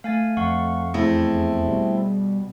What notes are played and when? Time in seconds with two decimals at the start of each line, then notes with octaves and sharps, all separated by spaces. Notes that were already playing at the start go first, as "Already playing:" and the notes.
0.04 A3 F5 G#5 A6
0.37 F2 F5 F#5 C#6
0.94 E2 A3 C4 E4 G#4
1.67 B2 G3